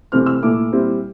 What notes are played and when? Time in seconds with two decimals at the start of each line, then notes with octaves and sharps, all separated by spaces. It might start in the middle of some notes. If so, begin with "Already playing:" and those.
0.12 C3 E3 A3 C4 F6
0.26 E6
0.42 A#2 A3 E4 D6
0.72 A#2 G3 C4 E4